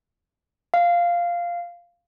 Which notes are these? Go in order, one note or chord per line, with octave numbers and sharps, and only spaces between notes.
F5